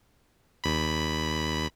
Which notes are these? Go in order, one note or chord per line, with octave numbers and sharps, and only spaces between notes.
D#2 B5